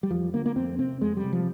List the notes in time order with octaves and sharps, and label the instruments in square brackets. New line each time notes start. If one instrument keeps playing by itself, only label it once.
[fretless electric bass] G3
F2 F3
D3 A#3
A#3
F2 C4
C3 C4
F2 G#3
G3
C3
F3